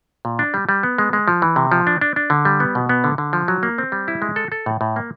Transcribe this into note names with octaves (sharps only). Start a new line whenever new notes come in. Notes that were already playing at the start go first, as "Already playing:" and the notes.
A#2
D4
G3
G3
B3
G#3
G#3
F3
E3
C3
F3
D4
D4
D4
D3
G3
B3
B2
B3
D3
D3
F3
F#3
A#3
C4
G3
E4
G#3
A4
A4
A2
A2
A#3